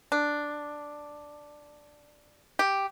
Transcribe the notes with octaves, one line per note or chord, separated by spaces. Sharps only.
D4
G4